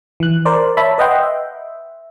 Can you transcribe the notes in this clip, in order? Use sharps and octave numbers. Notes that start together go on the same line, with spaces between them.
E3 F#6
A#4 C5 D5
C#5 E5 A5 B5
B4 D#5 F#5 G5 C6
E5